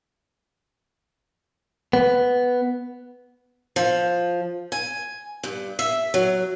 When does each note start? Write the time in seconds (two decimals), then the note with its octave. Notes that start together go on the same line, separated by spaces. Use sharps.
1.93 B3
3.76 F3
4.72 G#5
5.43 G2
5.79 E5
6.14 F#3